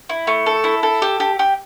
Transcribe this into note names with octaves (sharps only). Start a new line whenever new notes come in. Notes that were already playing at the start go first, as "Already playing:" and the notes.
E4
A3
A4
E4
A4
G4
G4
G4